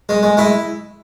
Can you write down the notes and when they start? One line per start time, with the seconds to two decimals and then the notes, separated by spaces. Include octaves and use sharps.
0.09 G#3
0.23 G#3
0.37 G#3 E4